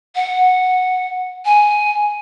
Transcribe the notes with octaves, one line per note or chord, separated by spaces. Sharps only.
F#5
G#5